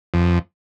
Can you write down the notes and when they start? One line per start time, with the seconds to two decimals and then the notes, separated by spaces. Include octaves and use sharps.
0.14 F2